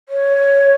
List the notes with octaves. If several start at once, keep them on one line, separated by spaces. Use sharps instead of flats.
C#5